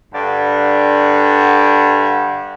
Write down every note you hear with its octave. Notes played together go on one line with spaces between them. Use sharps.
G2 D3 D5 F#5